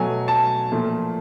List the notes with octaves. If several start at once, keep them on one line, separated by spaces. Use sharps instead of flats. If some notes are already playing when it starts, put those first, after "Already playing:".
Already playing: B2 F#3 A3 G#5
A5
A#2 F3 A3